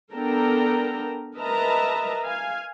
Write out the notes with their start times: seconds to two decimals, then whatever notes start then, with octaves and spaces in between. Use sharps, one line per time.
0.14 B3 D4 A4 A#4 G5 A#5
1.37 A#4 B4 D#5 E5 A5 A#5
2.25 F5 G#5